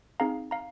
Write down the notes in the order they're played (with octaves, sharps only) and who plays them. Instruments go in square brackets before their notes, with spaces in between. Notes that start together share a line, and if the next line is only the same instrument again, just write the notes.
[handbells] C4 D#4 G#4 F5 A#5
F5 A#5